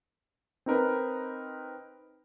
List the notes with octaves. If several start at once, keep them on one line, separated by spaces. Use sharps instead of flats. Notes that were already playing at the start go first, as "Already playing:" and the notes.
C4 D#4 A#4 B4